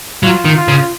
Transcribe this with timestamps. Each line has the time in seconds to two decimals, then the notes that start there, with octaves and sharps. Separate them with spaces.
0.23 F#3 F4
0.45 D#3
0.57 F4
0.68 C#3